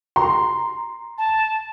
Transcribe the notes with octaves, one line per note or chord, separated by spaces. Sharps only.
A#5 C6
A5